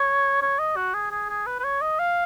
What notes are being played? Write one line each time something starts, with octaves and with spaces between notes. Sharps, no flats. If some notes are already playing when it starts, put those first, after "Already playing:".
Already playing: C#5
C#5
D#5
F#4
G#4
G#4
G#4
B4
B4
C#5
D#5
F5